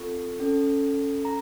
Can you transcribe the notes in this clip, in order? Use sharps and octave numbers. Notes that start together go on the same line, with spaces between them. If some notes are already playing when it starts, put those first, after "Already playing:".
Already playing: C4 F4 A4 C#6
C#4 A4
A#5